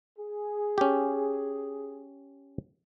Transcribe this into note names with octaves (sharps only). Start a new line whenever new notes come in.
G#4
C#4 G4